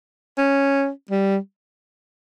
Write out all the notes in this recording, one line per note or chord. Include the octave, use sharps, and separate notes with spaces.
C#4
G3